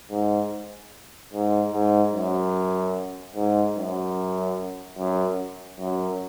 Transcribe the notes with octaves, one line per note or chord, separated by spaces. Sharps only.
G#2
G#2
G#2
F#2
G#2
F#2
F#2
F#2